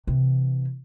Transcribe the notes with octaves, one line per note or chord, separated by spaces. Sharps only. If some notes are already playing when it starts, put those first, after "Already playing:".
C3 E3